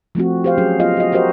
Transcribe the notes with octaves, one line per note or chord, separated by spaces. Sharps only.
F3 A3 C4 F#4
G4 C5 F5
F#3 C#4 F#4 G#4
B3 F4 D#5 F5
F#4 D#5
F#4 G4 A#4 C5 D#5